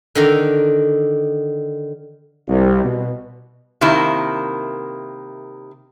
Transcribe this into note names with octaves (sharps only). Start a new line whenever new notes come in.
D3 D#3 A#5
C2
B2
C3 D#3 A#3 E4